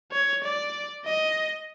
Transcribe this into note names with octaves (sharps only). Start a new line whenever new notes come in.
C#5
D5
D#5